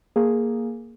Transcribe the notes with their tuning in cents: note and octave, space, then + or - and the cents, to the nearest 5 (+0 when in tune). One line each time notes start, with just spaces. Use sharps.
A#3 +0 G#4 +0